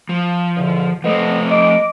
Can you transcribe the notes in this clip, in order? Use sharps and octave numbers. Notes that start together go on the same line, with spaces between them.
F3
E2 B2 D3
F3 A3 B3 A4 C5 D#5
D#5 D6